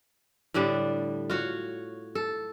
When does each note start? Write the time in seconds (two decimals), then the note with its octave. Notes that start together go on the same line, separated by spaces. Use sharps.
0.54 A2 D3 G3 D4
1.30 F4 F#4 C#5
2.15 A4